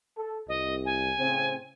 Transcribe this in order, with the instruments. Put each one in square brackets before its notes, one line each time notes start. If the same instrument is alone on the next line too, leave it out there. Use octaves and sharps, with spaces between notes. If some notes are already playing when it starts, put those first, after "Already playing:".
[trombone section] A4
[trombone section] C2 [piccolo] D#5
[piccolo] G#5
[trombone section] A2 C#3 C4